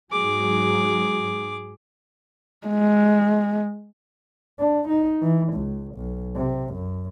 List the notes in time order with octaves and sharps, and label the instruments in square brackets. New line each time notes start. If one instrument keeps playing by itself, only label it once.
[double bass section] G#2 F#3 [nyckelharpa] G#4 D6
[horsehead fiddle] G#3
[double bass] D4
D#4
E3
C#2
B1
C3
F#2